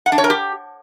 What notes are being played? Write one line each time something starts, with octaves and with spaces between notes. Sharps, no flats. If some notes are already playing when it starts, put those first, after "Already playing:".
F#5
D4
C#5
A#4
G4